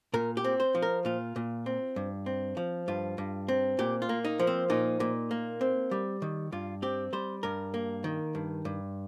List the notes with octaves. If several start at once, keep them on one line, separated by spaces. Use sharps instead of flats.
A#2 A#4
G4
C4
C5
F3
A#4
A#2 F4
A#2
C4
G2
C4
F3
G2 F4
G2
C4
A#2 G4
F4
A#3
D#4
F3
C4
A#2 D#4
A#2
A#3
C4
G3
D#3
G2 F4
C4 G4
G3 C5
G2 A#4
A#3
D#3
G2
G2